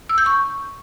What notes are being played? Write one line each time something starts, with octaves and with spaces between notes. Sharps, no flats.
E6
G6
C#6